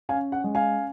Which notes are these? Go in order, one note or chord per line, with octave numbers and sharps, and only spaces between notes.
C#4 F5 G#5
F#5
G#3
F5 G#5